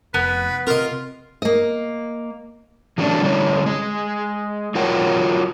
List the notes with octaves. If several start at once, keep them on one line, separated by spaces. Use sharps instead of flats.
F1 B3 B4
C3 C4 F4 A#4 D#5
A#3 D#5
E3 F#3 G3 A3 C#4 D4
D3 G3 C#4 E4 C#5
G#3 G#4
F#3 F4 A#4 C#5 F#5 G5